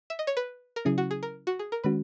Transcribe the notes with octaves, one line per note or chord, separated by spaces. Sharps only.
E5
D#5
C#5
B4
A#4
C#3 F#3 C#4 E4 G#4
F#4
G#4
A#4
F#4
G#4
A#4
D#3 G#3 C#4 F#4 B4